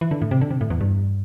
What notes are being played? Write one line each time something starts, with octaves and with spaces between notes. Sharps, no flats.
E3
D3
A2
C3
D3
C3
A2
E2
G2